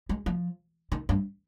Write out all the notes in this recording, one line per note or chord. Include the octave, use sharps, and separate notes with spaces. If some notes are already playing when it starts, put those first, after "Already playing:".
G#3
F3
D#3
G2